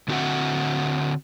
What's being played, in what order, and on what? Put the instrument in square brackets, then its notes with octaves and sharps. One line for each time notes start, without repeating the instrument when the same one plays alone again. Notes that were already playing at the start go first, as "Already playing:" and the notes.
[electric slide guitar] D3 C4 F#4 G#4 E5 F#5